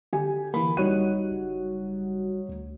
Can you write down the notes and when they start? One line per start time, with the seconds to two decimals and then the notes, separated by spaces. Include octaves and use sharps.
0.13 D3 G4 G#5
0.54 E3 A#3 B5
0.77 F#1 G3 D#4 F#4 C#5 F#5 D#7
1.31 F#1
2.49 D2